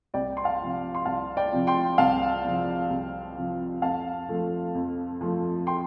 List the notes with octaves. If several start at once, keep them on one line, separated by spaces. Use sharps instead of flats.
C2 D5 G5
C6
F5 A5
C3 F3 C4
C6
C2 F5 A5
D5 G5
C3 F3 C4
G5 C6
C2 F5 A5
C3 F3 C4
C2
C3 F3 C4
F2 F5 A5
F3 A3 C4
F2
F3 A3 C4
G5 C6